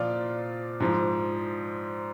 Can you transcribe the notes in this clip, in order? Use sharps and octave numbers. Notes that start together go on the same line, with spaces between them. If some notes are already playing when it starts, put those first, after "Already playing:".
Already playing: A#2 F3 F4 D5
G#2 F3